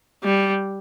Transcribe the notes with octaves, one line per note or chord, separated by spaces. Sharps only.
G3